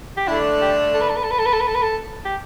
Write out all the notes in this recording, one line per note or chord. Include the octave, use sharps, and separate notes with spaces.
G4
D3 A3 D4 E4
G4
A4
B4
A4
B4
A4
B4
A4
B4
A4
B4
A4
B4
A4
G4